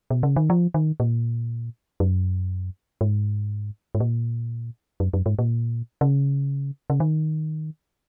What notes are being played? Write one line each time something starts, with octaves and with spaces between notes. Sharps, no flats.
B2
C#3
D#3
F3
D#3
A#2
F#2
G#2
G#2
A#2
F#2
F#2
G#2
A#2
C#3
C#3
D#3